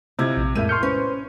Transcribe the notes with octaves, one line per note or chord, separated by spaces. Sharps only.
C3 E4 F4 D#5 G#6
A#1
F2 A2 G#3 A#3 E5 G6 D#7
C6 C#6 F6 G6 C#7
C#4 B4 C5